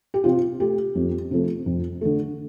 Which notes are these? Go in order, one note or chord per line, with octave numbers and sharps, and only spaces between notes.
G4
C3 F4
A3 G4
F2
C3 F3 A3
F2
D3 A3